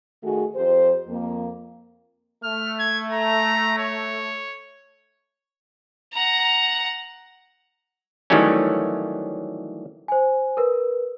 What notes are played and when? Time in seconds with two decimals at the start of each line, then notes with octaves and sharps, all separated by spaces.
0.23 D#3 A3 F#4 G#4
0.55 F2 G4 C5
1.08 F2 A#3
2.43 A3 F6
2.79 G#6
3.12 A#5
3.78 C#5
6.13 F#5 A#5
8.30 D#3 E3 F#3 G3 A3 C#4
10.08 C5 G#5
10.57 A#4 B4